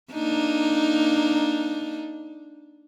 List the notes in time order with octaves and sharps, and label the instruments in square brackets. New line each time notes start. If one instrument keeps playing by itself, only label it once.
[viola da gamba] A#3 D4 D#4